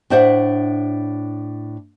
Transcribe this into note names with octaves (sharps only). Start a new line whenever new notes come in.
A2 D4 C5 E5 F#5